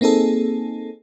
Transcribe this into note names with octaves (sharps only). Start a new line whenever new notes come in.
A#3 C4 D#4 G#4 A4